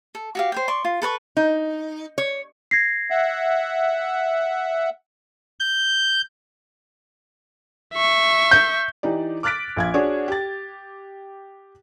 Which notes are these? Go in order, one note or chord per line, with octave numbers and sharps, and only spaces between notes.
A4
F#4 G4 F5
C5 C#5 G5
D5 C6 C#6
F4
A4 B4 A5 C#6
D#4
C#5
G#6 A#6 C7
E5 F#5
G6
E5 C#6
G6
E3 D#4 G4 D5
D6 F6 F#6 A6 B6 D7
A#1 F5 G#6
D4 F#4 G#4 C#5 D5
G4 A6